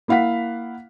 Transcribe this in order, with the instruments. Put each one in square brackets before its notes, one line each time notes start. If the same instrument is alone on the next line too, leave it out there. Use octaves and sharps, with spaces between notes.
[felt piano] A#3 E4 F5 F#5 B6